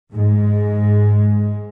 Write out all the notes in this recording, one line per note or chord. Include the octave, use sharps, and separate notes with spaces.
G#2 G#3